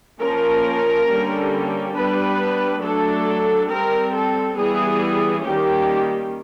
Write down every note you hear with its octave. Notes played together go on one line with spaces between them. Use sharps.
F3 A#3 C#4 A#4
D3 G3 A#3 C#4
G3 B3 D4 B4
F#3 A3 D4 A4
G3 C4 A#4
A4
E3 G3 B3 G#4
D#3 G3 A#3 C#4 G4